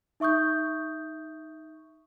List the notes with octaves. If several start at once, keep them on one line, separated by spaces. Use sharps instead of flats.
D#4 E5 C#6 D#6 G6